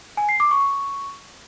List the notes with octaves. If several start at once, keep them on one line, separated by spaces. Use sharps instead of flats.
G#5
C7
D6
C#6